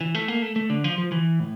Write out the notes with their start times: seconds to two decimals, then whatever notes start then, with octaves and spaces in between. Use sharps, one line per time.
0.01 E3
0.15 A3
0.28 A#3
0.42 A3
0.56 A3
0.70 D3
0.84 F3
0.98 F3
1.12 E3
1.40 A2